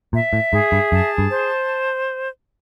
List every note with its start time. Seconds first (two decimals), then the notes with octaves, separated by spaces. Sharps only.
0.13 A#2 E5
0.33 A2
0.53 G#2 G#4
0.72 G2
0.92 F#2 A5
1.18 G2
1.31 C5